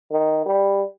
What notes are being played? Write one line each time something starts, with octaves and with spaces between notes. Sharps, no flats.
D#3
G3